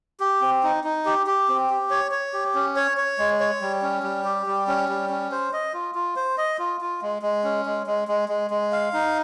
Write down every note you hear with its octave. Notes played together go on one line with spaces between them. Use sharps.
G4
C4
D#4
D#4
G4
G4
C4
G4
C#5
C#5
G4
C#4
C#5
C#5
G#3
C#5
G3
C#4
G3
G4
G3
C#4
G3
C#4
C5
D#5
F4
F4
C5
D#5
F4
F4
G#3
G#3
C#4
G#3
G#3
G#3
G#3
G#3
F5
D#4